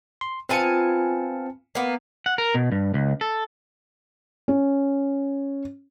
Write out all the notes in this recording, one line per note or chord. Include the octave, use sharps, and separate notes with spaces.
C6
B3 C4 F4 G#5 A5 C#7
A#3 B3
F#5
A#4
B2
G2
C#2
A4
C#4